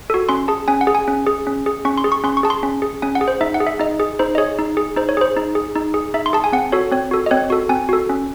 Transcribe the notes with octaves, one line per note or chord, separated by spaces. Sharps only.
F#4 A4
C#4 C6
G#4 A5
C#4 G#5
F#5
G#4
G#5
C#4
G#4
C#4
G#4
C#4 C#6
C6
G#4
C#6
C#4 C6
C#6
G#4 A5
C6
C#4
G#4
C#4 G#5
F#5
G#4
C5
D#4 E5
F#5
G#4
E5
D#4 D#5
G#4
D#4 C5
D#5
G#4 C#5
D#4
G#4
D#4 C5
C#5
G#4 C5
D#4
G#4
D#4
G#4
D#4 E5
C6
G#4 A5
G#5
C4 F#5
F#4 A4 C#5
C4 C#5
F#4 A4
D#5
C4 C#5
F#4 A4
C4 G#5
F#4 A4
C#4